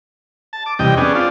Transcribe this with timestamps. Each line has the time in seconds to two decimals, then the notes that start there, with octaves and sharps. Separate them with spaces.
0.53 A5
0.66 D6
0.79 E2 C3 G3 D#5 G5
0.97 B3 C#4 D4 G#4
1.15 C4 D4 F4